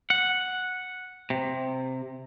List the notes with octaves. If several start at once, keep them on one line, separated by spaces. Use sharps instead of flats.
F#5
C3